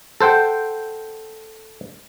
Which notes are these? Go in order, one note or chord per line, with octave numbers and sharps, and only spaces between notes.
A4 C5 F#5 G5